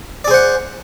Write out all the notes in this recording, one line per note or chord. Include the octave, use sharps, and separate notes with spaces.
G#4 C5 D5 F#5